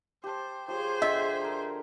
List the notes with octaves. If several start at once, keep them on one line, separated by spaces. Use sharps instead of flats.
G4 C5 A5
F3 G4 G#4 C5 C#5
D3 D#5 E5
A#4 A#5